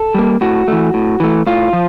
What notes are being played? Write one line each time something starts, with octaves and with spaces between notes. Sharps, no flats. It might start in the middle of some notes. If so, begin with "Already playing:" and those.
Already playing: A4
G3 A#3
A2 F#4
E3 A3
A2
E3 A3
A2 F4
F3